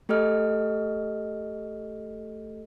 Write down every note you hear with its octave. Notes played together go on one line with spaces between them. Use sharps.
A3 G4 A4 D#5 F6